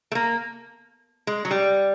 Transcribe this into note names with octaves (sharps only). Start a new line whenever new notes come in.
A3
A#3
G#3
F#3
G3